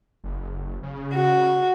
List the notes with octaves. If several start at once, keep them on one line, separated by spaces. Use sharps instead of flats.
F#1
C#3
F#4